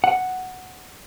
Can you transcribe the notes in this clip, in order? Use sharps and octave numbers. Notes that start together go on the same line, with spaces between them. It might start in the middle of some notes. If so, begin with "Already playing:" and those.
F#5